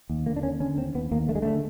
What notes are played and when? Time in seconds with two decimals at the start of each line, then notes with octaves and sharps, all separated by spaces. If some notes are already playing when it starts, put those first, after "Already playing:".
0.10 D#2
0.26 D3 A#3
0.36 D4
0.43 D#2 C#4
0.60 D3 C#4
0.77 D#2 C4
0.95 D#2 B3
1.11 D#2 A#3
1.29 D3 A3
1.35 G#3
1.42 D3 A3